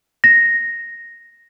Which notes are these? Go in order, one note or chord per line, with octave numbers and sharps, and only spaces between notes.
A#6